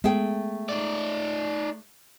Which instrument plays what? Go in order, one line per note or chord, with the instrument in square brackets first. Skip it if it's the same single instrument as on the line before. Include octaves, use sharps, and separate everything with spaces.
[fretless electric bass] G#3 B3 [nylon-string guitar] A3 G#4 G5
[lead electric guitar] D#4 D5